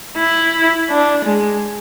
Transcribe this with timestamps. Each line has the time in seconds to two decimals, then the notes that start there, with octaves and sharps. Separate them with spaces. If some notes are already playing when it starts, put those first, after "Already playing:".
0.17 E4
0.90 D4
1.25 G#3